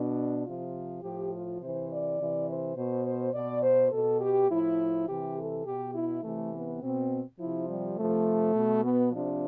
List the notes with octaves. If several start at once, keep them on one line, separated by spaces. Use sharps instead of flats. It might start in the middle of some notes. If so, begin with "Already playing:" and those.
Already playing: B2 D4
C3 F3 F4
A2 F3 G4
F4
C3 E3 C5
D5
C3 E3
C5
B2 C5
C5
B2 D5
C5
B2 A4
G4
A2 F3 E4
C3 E3 G4
A4
B2 G4
E4
C3 E3 A3
B3
B2 C4
C3 F3 E4
G3
C3 F3 A3
B2
B3
C3 F3 D4